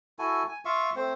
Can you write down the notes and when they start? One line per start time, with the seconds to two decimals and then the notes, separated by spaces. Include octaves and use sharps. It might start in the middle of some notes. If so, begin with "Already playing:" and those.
0.19 E4 F#4 A4 G#5
0.49 G#5
0.65 F4 E5 F5 C#6
0.96 A3 C4 C5